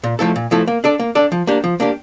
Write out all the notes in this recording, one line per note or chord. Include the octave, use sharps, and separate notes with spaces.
A#2
F3 A3 E4 A4
A#2
F3 A3 E4 A4
A#3
D4 A4 D5
A#3
D4 A4 D5
F3
A#3 D4 G4
F3
A#3 D4 G4